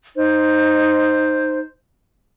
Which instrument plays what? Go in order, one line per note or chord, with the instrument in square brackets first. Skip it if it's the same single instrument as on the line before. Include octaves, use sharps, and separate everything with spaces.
[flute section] D#4 C5